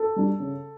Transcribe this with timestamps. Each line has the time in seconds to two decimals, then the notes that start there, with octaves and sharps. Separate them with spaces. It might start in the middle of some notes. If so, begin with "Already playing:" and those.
Already playing: A4
0.16 G3 D4
0.40 C#3